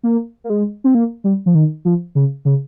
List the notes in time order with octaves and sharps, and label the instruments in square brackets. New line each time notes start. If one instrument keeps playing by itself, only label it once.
[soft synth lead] A#3
A#3
G#3
C4
A#3
G3
F3
D#3
F3
C#3
C#3